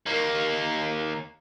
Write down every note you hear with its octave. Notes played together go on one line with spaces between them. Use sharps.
D#2 A#3